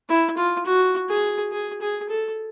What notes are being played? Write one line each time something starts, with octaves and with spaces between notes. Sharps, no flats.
E4
F4
F#4
G#4
G#4
G#4
A4